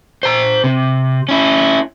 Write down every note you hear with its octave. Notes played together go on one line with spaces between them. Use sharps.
C5 A#5
C3
C#4 E4